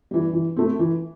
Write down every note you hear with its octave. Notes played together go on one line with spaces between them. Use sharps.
E3 G3
E3
A3 C4
E3